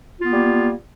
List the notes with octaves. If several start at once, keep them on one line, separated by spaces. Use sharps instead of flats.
G3 A#3 B3 F4